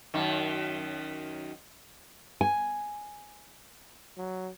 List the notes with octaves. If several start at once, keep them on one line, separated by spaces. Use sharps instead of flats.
F#2 D#3
G#5
F#3